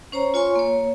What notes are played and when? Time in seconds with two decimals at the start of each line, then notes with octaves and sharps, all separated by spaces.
0.12 C#4 C5 C#5 A#5
0.34 F4 C#5 G#5 C6 C#6
0.55 A#3 C#5